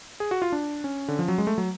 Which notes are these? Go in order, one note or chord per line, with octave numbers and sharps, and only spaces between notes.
G#4
F#4
F4
D4
C#4
D3
F3
F#3
G#3
A3
F#3